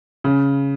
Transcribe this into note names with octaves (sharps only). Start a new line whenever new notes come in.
C#3